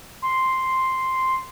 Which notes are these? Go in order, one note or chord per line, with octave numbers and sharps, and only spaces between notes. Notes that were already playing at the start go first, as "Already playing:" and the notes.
C6